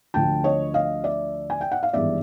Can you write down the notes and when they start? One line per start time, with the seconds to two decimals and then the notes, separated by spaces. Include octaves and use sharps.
0.14 D2 D3 F3 G5 A5
0.44 C#5 D#5
0.74 D#5 F5
1.04 D5 E5
1.50 G#5
1.61 G5
1.72 F#5
1.83 F5
1.93 G#1 G2 E3 G#3 B3 D5 E5